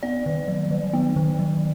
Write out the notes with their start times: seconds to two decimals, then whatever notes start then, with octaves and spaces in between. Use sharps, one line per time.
0.03 B3 D5
0.26 D#3
0.48 F#3
0.71 D#3
0.93 B3
1.16 D#3
1.39 F#3